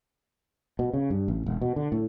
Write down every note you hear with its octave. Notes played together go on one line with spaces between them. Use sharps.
B2
C#3
G2
A1
E1
B2
D3
A2